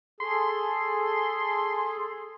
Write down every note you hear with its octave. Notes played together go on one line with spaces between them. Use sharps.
G#4 A4 C6